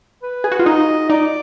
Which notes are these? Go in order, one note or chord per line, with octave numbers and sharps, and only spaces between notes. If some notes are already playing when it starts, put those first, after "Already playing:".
B4
G#4
F#4
F4
D#4 D#5
D#4 D5